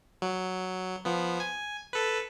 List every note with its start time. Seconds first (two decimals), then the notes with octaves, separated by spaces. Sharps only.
0.22 F#3
1.05 F3 B3
1.40 G#5
1.93 A4 B4